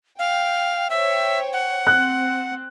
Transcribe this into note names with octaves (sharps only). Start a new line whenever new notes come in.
F5 G5
C5 C#5 E5 G5
F#5
C4 F#6